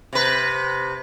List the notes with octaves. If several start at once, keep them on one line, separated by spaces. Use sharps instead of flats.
C3 B4